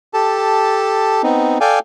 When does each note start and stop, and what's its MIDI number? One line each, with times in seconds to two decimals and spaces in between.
0.14 1.22 67
0.14 1.22 69
0.14 1.22 81
1.23 1.58 59
1.23 1.58 60
1.23 1.58 63
1.61 1.79 69
1.61 1.79 74
1.61 1.79 77
1.61 1.79 79
1.61 1.79 80